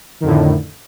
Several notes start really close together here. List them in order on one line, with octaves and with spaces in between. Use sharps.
D#3 F2 D3 A2